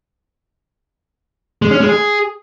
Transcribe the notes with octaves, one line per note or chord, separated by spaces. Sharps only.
G#3
C#4
G#3
G#4